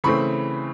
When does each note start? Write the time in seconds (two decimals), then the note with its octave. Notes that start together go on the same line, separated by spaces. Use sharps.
0.04 C#3 E3 A3 C4 B5 C#6